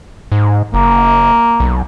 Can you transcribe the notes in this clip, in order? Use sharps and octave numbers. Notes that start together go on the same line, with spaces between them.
G#2
F#1 A#3
B1